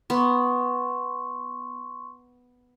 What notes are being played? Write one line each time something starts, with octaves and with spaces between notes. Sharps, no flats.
B3 C6 C#6